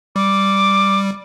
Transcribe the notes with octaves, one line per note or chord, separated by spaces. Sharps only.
G3 D6